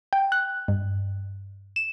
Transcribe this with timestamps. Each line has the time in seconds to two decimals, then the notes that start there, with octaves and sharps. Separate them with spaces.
0.13 G5
0.32 F#6
0.68 G2
1.76 E7